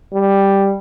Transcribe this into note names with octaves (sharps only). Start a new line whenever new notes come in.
G3